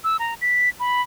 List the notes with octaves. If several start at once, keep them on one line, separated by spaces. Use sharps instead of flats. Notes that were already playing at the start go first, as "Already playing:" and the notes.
E6
A#5
B6
B5